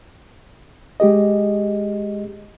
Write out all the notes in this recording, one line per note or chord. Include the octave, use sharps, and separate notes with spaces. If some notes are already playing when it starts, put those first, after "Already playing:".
G#3 G4 G#4 D#5